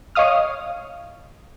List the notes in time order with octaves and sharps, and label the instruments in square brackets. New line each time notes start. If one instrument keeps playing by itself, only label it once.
[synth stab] C#5 D#5 F5 D#6 F6